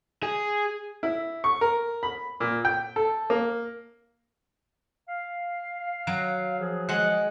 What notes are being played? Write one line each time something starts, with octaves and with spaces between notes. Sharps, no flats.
G#4
E4
C#6
A#4
B5
A#2
G5
A4
A#3
F5
F#3
F3 G#4
G#3 F#5